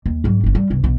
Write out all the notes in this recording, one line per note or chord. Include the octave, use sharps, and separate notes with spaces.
D#2
G#2 F#3
G1 D#4
G3
G1 C2
B1 B3